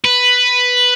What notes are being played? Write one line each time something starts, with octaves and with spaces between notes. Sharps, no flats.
B4